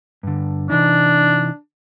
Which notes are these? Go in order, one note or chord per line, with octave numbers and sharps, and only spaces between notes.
G2 D3
C3 E3 D4 D#4